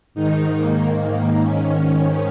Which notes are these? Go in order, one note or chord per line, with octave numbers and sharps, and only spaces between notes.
G#2 D#3 D#4
A#3
A#3
C#4